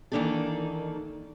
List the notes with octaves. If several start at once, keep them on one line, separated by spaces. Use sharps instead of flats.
D#3 E3 A#3 D4 D#4 A4